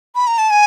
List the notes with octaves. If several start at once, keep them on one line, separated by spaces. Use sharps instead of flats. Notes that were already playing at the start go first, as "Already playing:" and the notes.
B5
A#5
A5
G#5